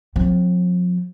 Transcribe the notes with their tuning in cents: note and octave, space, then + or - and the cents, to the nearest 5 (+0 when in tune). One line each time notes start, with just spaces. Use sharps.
F3 +45 C4 +0